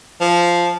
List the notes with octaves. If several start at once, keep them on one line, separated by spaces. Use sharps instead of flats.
F3